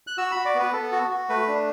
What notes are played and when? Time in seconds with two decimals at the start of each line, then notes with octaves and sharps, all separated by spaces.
0.07 F#6
0.17 F#4 E6
0.32 F#4 B5
0.45 D5
0.55 B3 B4
0.73 B3 A4
0.92 F#4
1.10 F#4
1.29 A3 B4
1.48 D4